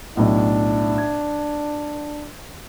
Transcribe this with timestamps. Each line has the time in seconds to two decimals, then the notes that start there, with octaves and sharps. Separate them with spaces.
0.17 B1 A2 D4
0.98 G#6